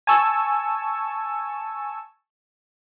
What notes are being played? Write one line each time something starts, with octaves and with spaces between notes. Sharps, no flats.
G#5 A5 C#6 E6